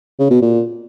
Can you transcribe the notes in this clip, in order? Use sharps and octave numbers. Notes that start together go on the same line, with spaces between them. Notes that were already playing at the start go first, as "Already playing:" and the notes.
C#3
B2
A#2